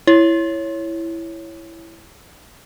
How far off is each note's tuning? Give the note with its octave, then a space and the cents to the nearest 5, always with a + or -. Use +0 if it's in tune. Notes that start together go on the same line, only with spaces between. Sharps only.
E4 +10 C#5 +0